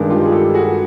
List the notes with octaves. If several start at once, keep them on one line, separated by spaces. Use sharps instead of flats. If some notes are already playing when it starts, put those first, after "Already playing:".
Already playing: G2 D#3 G#3
F4 G4
G#4
G4 A4
F#4 G#4